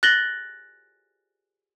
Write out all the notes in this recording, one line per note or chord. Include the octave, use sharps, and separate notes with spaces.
F#6 A6 A#6 F#7 G7